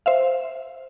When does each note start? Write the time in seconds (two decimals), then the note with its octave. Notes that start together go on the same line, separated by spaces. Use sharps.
0.06 C5 E5 F5